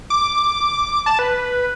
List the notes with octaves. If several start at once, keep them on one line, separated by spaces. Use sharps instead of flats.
D6
A5
B4